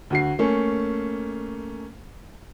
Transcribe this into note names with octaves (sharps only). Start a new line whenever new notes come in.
D2 F#4 C7
A3 A#3 C#4